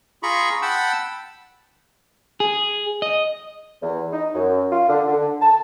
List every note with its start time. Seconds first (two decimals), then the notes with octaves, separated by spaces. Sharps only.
0.23 F4 G#4 A#5 B5 C#6
0.62 F#5 G5 A5 B5 E6
2.40 G#4
3.02 D#5
3.82 E2
4.12 D#4
4.34 F#2
4.72 F4
4.89 D3
5.07 D3
5.41 A5